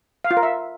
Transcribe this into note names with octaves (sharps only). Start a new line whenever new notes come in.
F5
F4
A#4
E5